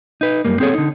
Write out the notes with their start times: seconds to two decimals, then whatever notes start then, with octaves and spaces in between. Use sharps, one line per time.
0.21 D#4 B4
0.45 F#2 G3 A#3
0.60 C4 G#4 A4 C#5
0.74 D3 D#4